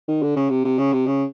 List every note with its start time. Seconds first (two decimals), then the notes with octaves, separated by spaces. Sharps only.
0.08 D#3
0.23 D3
0.36 C#3
0.50 C3
0.65 C3
0.79 C#3
0.93 C3
1.07 C#3